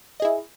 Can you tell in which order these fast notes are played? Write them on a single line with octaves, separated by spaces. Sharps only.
D#5 G#4 E4